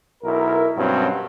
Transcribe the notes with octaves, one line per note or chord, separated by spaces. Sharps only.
B1 E4 A#4
G2 B2 F#3 C4 C#4